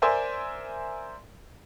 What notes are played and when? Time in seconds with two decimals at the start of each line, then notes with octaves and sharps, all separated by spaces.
0.02 A#4 C5 D5 E5 G#5 C6